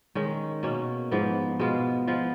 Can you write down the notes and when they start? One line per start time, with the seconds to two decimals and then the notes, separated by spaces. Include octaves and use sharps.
0.15 D#3 G#3 C#4
0.63 B2 A#3 C#4
1.11 G#2 F3 B3
1.59 B2 G#3 B3 F4
2.07 F3 B3 F4